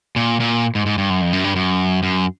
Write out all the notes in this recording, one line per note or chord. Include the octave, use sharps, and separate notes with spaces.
A#2
A#2
G#2
G#2
G2
F#2
F2
F#2
G2
F#2
F#2